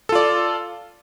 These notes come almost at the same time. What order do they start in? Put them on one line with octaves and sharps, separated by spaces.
A4 F4 D5